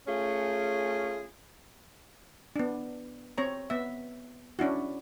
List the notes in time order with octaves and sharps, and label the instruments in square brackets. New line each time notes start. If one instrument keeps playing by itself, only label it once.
[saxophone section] A3 C#4 F4 G#4
[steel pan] B3 D4
C4 C#5 A#5
B3 E5
C#4 D4 E4 F#4